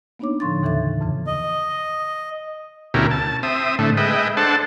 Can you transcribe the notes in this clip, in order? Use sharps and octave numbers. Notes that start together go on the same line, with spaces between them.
A#3 B3 D4 D#4 C#5 D6
A2 D3 F3 C6 C#6 A6
D#2 C#3 E3 A4 E5 A6
F2 C#3 E3
D#5
D2 B2 C#4 E4 G4 A#4
A5
C4 E5 D#6
A2 D3 A3
G#3 B4 D#5 E5 G5
D4 A4 C5 F#5 A5